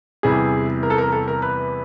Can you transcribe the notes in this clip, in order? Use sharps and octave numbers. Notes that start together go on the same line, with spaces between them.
E2 C3 E3 G3 G#4
A#4
A4
A#4
A4
A#4
B4